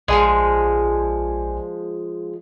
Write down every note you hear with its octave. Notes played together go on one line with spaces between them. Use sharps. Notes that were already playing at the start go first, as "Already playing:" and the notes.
A#1 F3 G#3 D5 G#5